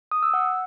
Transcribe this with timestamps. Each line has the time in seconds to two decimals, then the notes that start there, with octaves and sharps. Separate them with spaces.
0.12 D#6
0.23 E6
0.34 F#5